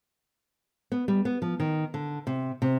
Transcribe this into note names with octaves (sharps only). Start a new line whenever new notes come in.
B3
G3
B3
F3
D#3
D3
C3
C3